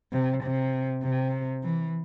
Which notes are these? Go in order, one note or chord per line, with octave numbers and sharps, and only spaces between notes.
C3
C3
C3
E3